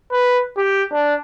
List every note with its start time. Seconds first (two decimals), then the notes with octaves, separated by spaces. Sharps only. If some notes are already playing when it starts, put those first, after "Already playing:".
0.12 B4
0.57 G4
0.92 D4